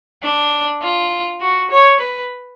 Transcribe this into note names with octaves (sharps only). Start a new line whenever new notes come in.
D4
F4
F#4
C#5
B4